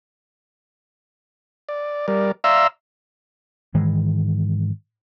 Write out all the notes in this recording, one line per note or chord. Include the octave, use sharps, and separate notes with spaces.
D5
G3 A#4 D5
D5 E5 F5 A#5 C6 E6
G#2 D#3 E3 G#3